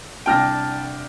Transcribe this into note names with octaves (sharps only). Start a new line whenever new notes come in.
C2 D4 G5 A5 F6 A#6 D7